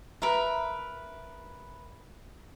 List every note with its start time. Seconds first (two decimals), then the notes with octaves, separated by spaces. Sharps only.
0.22 A#4 B4 E5